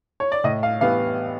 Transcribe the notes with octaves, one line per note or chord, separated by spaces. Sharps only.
C#5
D5
A2 D#5
F5
E3 G3 B3 F5